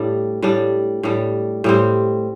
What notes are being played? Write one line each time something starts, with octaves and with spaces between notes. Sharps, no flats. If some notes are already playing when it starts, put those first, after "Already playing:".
Already playing: A2 G3 D4
A2 G3 D4
A2 G3 D4
A2 G3 C4